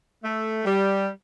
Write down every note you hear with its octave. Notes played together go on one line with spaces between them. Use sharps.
A3
G3